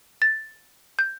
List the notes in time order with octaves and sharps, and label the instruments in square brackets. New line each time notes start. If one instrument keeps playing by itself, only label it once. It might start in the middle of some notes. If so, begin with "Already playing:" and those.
[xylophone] A6
G6